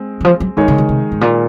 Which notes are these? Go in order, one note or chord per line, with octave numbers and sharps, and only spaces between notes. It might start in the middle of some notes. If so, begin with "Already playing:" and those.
Already playing: G#3 C4
D#3
F3
F#3
D#3 F3 G#3 D#4 G#4 C#5
C#3
C#3
C3
G#2
A#2